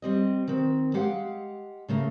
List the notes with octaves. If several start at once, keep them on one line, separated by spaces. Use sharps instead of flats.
G3 C4 D#5
D#3 C4
G#3 G4 F5 F#5
C#3 A3 A#3